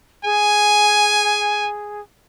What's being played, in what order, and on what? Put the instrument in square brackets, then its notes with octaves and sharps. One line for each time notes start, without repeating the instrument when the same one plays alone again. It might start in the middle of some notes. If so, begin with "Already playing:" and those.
[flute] G#4 [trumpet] G#5